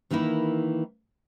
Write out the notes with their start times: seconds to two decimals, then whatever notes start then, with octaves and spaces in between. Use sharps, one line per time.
0.11 D#3 E3 A#3 D#4 E4